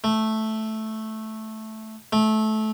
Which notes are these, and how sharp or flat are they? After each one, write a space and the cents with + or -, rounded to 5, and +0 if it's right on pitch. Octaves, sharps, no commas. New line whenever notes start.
A3 -5
A3 -20